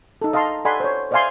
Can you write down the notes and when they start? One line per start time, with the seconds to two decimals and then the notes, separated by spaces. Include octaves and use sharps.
0.22 D#4 A4
0.33 D#5 F5 A5 A#5 C6
0.65 A4 D5 F#5 G#5 B5 C6
0.80 C5 C#5
1.11 C5 D5 E5 F5 G#5 C6